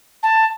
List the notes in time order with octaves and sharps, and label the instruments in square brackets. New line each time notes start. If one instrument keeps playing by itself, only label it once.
[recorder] A5